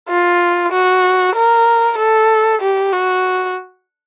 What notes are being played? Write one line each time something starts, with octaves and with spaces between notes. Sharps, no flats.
F4
F#4
A#4
A4
G4
F#4